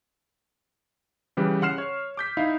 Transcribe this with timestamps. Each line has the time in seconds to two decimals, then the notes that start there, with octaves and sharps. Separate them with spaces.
1.37 C#3 E3 G3 G4 B4
1.62 C#3 F#5 C6 F6 C7 E7
1.78 C#5
2.17 D6 G6 B6
2.37 D#4 E4 E5 F5